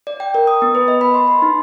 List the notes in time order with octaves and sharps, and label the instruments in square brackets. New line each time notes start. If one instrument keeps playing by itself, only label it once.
[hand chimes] D5
G5
A#4
D#6
B3
B4
D#5
B5
C6
C6
D#4